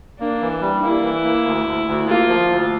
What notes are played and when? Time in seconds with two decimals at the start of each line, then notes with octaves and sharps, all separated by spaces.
0.20 A#3 D4
0.41 E3
0.61 G3
0.82 A#3 E4
1.03 E3
1.24 A#3
1.45 D2
1.66 D2
1.86 D2
2.07 A#3 F4
2.29 F3
2.49 D2